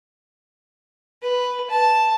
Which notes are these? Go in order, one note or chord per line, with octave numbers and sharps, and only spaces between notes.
B4
A5